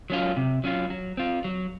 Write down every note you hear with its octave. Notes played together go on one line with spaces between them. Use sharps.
F#3 C#4 F4
C3
F#3 C#4 F4
F#3
C4 F4
F#3